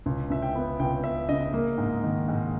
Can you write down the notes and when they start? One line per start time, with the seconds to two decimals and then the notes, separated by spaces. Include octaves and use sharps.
0.06 C#2
0.30 C#2 E5
0.42 G5
0.55 B3
0.80 C#2 G5
1.04 B3 E5
1.29 C#3 D#5
1.54 A#3
1.78 G#2
2.04 D#3
2.28 G#2